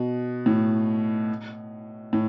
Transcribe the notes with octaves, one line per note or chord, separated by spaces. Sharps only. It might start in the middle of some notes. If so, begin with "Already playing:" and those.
Already playing: B2
A2
A2